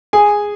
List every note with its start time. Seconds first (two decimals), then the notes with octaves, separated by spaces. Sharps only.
0.13 G#4 G#5